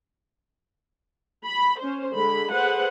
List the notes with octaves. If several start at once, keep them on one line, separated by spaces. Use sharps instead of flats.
B5
C#4 C5
D3 G#3 B5
G#4 A4 B4 C5 F#5